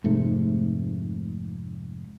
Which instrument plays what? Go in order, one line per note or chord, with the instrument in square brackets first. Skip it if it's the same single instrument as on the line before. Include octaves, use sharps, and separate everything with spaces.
[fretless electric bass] F1 G#2 C3 A3